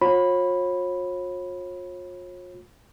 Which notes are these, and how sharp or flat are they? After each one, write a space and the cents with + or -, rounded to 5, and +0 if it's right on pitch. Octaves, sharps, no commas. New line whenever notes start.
F4 +45 C#5 -40 B5 +0